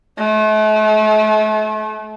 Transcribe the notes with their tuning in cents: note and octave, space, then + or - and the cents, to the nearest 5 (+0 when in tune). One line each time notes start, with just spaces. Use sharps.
A3 -40